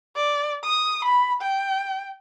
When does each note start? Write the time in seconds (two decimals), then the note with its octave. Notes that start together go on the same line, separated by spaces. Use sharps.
0.16 D5
0.64 D#6
1.05 B5
1.42 G5